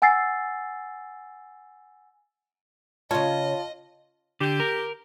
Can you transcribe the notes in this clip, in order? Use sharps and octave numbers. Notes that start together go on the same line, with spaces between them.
F#5 G#5 E6 A6 C7
C#3 F4 C#5 D#5 A5
D3 G4
A#4